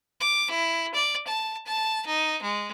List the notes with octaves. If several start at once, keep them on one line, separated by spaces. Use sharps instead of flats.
D6
E4
D5
A5
A5
D#4
G#3